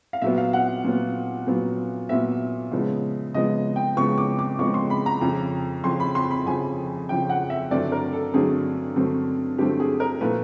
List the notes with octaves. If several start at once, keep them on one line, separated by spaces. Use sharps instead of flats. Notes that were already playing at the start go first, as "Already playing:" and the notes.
F5
A#2 F#3 B3 E5
F5
F#5
A#2 F#3 B3
A#2 F#3 B3
A#2 F#3 B3 E5
C#3 F3 G#3 B3
C#3 F3 G#3 B3 D#5
G5
C#3 F3 G#3 B3 C#6
D6
D6
C#3 F3 G#3 B3 C#6
C6
B5
A#5
F2 C#3 F3
F2 C#3 F3 C6
B5
C6
B5
F2 C#3 F3 G#5
F2 C#3 F3 G5
F#5
E5
G2 D3 F#3 A3 C4 D5
A#4
A4
G2 D3 F#3 A3 C4 G#4
G2 D3 F#3 A3 C4
G2 D3 F#3 A3 C4 G4
G#4
A#4
A#2 F3 A3 B4